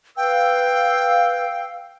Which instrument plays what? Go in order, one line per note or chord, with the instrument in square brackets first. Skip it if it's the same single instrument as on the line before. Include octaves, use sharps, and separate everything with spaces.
[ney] B4 [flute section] F5 E6 [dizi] G5